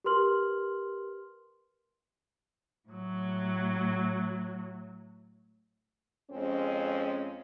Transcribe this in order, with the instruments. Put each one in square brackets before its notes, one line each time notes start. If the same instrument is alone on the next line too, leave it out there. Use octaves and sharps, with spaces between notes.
[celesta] G4 A#4 B4 C6 F6 F#7
[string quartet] A2 F#3
[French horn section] F2 G#3 C4 C#4